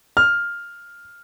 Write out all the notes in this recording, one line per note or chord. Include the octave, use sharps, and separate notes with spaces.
F6